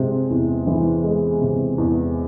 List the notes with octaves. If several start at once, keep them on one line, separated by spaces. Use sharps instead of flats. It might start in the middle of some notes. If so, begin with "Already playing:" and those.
Already playing: C3 G#3
E2
E3
G#3
C3
E2